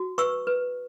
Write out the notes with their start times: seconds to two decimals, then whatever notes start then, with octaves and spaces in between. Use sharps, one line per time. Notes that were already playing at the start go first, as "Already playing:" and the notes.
Already playing: F#4
0.18 B4 C#6 E6
0.47 B4